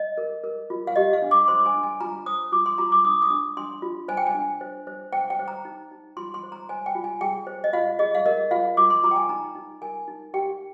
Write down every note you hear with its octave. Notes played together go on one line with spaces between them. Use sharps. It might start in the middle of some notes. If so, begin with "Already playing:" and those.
Already playing: D#5
A#4
A#4
F4
F5
G4 D#5
F5
D4
D6
C5 C6
G#5
D4
G#5
F4 A#5
C5 D#6
F4 D6
C6
F4 A#5
D6
D4 D#6
D#6
D4
D4 C6
F4
C5 G#5
G5
G#5
D4
C5
C5
C5 G5
G5
C5
A#5
D#4
D#4
F4 C6
C6
C5
A#5
C5 G#5
G5
F4
G#5
G#4 G5
C5
D#5
F4 F5
G#4 D#5
F5
A#4 D#5
F4 F5
F4 D6
C6
F4 A#5
G5
G#5
D#4 A#5
D#4
A#4 G#5
D#4
G4 G5